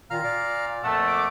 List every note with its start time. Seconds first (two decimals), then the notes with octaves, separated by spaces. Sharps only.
0.11 A#2 D#3 F4 F5 A#5 F6
0.22 A#2 D5
0.84 F2 A#2 A3 F#5 A5
1.07 D6